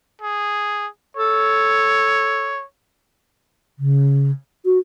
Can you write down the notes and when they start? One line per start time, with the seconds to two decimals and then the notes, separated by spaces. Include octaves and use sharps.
0.22 G#4
1.17 A4 C#5
3.79 C#3
4.65 F#4